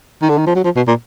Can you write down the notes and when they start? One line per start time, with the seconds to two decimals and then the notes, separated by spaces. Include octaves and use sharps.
0.22 D#3
0.29 D3
0.38 D#3
0.46 F3
0.55 F#3
0.64 F3
0.76 B2
0.87 A#2